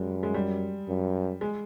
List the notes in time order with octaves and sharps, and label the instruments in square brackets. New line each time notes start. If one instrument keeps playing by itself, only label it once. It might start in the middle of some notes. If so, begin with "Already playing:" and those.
Already playing: [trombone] F#2 [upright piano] G3 G#3
[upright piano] G#3
G3
[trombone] F#2
[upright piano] G#3